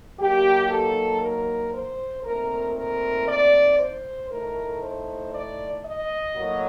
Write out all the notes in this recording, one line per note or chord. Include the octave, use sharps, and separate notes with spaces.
F#3 A#3 D#4 G4
A4
A#4
C5
A#2 A3 C4 D#4 A#4
A#4
D5
C5
A2 A3 D#4 A#4
C5
D5
D#5
A2 F#3 A#3